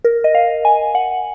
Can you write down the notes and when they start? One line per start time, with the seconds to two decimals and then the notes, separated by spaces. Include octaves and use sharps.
0.05 A#4
0.24 D#5
0.35 F5
0.65 G#5
0.95 F#5